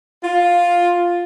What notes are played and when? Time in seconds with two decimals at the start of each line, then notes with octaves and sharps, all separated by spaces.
0.23 F4